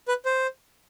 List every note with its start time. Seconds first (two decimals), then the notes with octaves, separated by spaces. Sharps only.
0.08 B4
0.25 C5